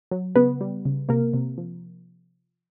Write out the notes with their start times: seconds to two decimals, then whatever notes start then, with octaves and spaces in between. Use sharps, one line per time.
0.11 F#3
0.35 C#3 B3 B4
0.61 G3
0.85 C#3
1.09 C3 A#3 A#4
1.34 C3
1.58 F3